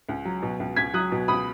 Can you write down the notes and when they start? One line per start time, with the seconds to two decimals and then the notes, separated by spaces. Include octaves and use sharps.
0.09 C#2
0.25 F#3
0.42 B2
0.60 C#2
0.76 C#2 G#6 B6
0.93 F#3 D#6 F#6
1.12 B2
1.28 C#2 B5 D#6